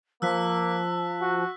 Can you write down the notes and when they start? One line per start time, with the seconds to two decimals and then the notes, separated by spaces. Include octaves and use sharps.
0.22 F3 A#3 A5 E6 F#6 B6
1.21 F#4